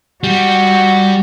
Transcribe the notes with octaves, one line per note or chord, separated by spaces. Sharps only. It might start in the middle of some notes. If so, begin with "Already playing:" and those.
G3 F#4